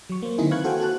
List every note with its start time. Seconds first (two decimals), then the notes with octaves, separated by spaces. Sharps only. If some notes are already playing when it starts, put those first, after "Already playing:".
0.10 F#3 C#6
0.22 A#3 C5
0.38 D3 D#3 C4 D#4 E4 G#4
0.51 B4 F5 C#6 F#6 G#6
0.64 F#4 A4 C5 F5 G5 G#5
0.81 F#4 A5 F#6